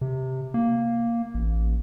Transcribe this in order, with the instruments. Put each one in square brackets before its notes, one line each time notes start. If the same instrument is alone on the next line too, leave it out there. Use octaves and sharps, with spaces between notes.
[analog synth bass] C3
A#3
A1